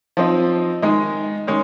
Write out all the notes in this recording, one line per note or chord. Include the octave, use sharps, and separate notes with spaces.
F3 C4 D#4
D#3 G#3 D#4
D#3 G#3 C#4